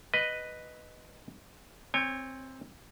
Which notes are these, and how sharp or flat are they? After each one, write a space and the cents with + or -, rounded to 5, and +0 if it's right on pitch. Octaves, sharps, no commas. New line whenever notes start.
B4 +0 D#5 -5
C4 +5 C#5 +0 G#5 -45